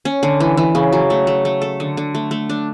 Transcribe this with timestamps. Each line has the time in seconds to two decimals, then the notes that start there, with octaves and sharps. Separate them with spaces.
0.05 C#4
0.23 D3
0.40 E3
0.57 E3
0.75 C#3
0.92 F#3
1.10 A3
1.27 A3
1.45 A3
1.62 A4
1.80 D3
1.97 D3
2.15 A3
2.31 A3
2.50 D4